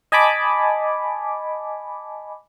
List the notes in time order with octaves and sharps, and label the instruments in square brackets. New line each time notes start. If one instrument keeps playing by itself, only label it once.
[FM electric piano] D#5 G#5 A5 B5 D6